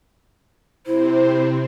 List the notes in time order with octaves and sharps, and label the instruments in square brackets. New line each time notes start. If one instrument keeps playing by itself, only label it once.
[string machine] C3 C4 [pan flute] E4 [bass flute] C5